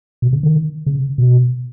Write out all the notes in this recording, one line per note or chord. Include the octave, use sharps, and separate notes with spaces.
B2
C#3
D#3
C#3
B2